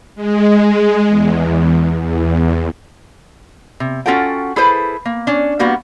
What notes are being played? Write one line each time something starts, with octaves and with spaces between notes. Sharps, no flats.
G#3
E2
E2
C3
C#4 F4 F#4 A4 F#5 G5
E4 G#4 A4 B4 C5
A#3
C#4 D4
G3 A#3 B3 F#4